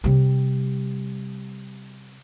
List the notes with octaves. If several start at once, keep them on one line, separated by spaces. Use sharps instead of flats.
C3 G3